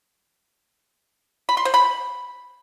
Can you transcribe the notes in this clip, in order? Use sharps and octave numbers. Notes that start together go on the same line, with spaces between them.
B5
C6
C5
B5